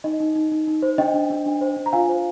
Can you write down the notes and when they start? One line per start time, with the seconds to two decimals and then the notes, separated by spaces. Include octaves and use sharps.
0.04 D#4 D#5
0.20 D#4
0.36 D#4
0.52 D#4
0.67 D#4
0.82 C5
0.98 D4 D#5 G5
1.14 D4
1.30 D4
1.46 D4
1.61 C5
1.77 D4
1.86 A#5
1.93 F4 F5 G#5
2.09 C5